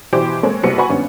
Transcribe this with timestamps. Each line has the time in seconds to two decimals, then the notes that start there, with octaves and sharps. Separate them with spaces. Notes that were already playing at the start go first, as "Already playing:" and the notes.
0.13 B2 E3 G4 C5 D6 D7
0.43 G#3 A#3 C4 A4 C#5
0.63 F#1 C2 F#4 B4 C#7
0.78 F#4 B4 F#5 G#5 B5 C#6
0.89 G#1 G2 B3 C#4